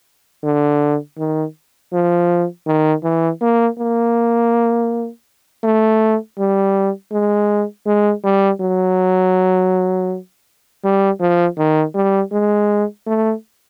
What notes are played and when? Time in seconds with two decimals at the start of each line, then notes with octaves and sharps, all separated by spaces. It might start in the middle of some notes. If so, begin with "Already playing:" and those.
0.44 D3
1.18 D#3
1.93 F3
2.67 D#3
3.03 E3
3.41 A#3
3.78 A#3
5.64 A3
6.38 G3
7.12 G#3
7.86 G#3
8.24 G3
8.61 F#3
10.84 G3
11.20 F3
11.58 D#3
11.95 G3
12.32 G#3
13.07 A3